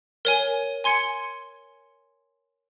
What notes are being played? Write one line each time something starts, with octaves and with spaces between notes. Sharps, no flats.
A#4 C#5 G#5
G#5 C6 G#6 C#7